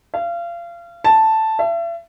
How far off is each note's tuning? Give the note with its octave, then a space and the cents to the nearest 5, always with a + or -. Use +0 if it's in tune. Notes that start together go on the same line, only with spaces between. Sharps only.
F5 -30
A5 +0
E5 +40